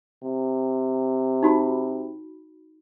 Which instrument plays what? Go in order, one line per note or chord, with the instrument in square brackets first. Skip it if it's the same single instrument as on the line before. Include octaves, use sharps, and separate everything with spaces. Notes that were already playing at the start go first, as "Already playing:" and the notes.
[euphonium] C3
[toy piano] D#4 F#4 B5